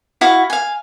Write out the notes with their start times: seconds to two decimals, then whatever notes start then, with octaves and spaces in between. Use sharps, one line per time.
0.21 E4 F#4 F5
0.50 F5 G#5